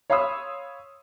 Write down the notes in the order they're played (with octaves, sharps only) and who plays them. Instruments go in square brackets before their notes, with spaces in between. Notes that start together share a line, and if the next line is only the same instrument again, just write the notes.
[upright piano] C#5 F5 B5 C6 D#6 E6